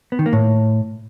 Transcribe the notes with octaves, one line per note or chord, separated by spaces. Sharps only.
B3
D#3
A#3
A2